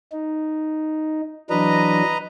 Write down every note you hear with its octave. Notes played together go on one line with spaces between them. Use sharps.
D#4
E3 F#3 D4 B4 D#5 A#5